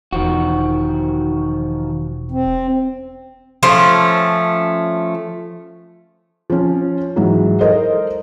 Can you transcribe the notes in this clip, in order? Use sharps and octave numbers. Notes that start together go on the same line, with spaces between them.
E1 D#3 F3 F#4
C4
F3 A3 C#4
F3 C#4
G#2 E3 F#3 G#3
A4 A#4 C5 D#5